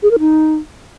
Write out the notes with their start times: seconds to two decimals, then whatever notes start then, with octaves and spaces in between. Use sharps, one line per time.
0.03 G#4
0.11 A#4
0.19 D#4